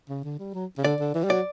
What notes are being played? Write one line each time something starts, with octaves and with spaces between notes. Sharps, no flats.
C#3
D3
G3
F#3
C#3
D3 D5
D3
E3
G3
F#3 D5